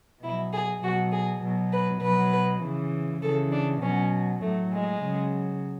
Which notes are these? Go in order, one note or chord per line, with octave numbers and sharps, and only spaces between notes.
B2 F#3 E4
G#4
B2 F#3 F#4
G#4
B2 F#3
B4
B2 F#3 B4
C#3 E3
C#3 E3 A4
D4
B2 F#3 C#4
A2 F#3 A3
G#3
C#3 F#3